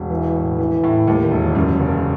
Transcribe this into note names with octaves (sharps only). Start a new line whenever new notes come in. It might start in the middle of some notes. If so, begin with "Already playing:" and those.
Already playing: E1
E3
A2
E3
A2
D#2
E1
F#2
F#1